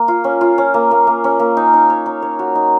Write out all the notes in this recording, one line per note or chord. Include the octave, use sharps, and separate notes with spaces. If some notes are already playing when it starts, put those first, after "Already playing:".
Already playing: A#3
F4
C#4
F4
C#4
A#3
A#3
A#3
C#4
A#3
D#4
D#4
C#5
D#4
C#5
F#4
D#4